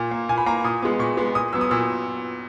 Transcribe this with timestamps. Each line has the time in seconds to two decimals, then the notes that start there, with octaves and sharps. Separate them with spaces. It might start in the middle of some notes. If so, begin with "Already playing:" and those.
Already playing: A#2
0.11 A#3
0.29 A#2 G#5
0.38 B5
0.46 A#3 A#5
0.64 A#2 D#6
0.83 G#3 B3
0.99 A#2 C#6
1.17 G#3 B3
1.35 A#2 D#6
1.53 F#3 B3 E6
1.61 D#6
1.71 A#2 E6